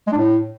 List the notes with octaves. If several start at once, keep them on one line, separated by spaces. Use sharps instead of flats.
G#3
D4
A2